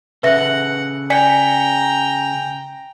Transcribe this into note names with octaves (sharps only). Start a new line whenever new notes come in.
C#3 A4 B4 E5 F#5 A#6
D5 G5 G#5 A#5 B6 C#7